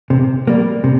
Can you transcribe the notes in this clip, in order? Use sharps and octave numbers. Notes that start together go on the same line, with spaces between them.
C3
G3 A#3
C3